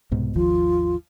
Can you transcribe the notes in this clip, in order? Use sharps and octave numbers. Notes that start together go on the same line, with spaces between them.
C2 G#2 B2
G#1 D#2 F3 F4